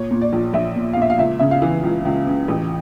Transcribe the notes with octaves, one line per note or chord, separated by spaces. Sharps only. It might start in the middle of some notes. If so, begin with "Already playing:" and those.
Already playing: A#2 C#5
A#2
D5
A#1
A#1 E5
A#2
F5
A#2 E5
F5
C#2 E5
C#3 E5
F5
E3
C#2
C#2
C#3
A1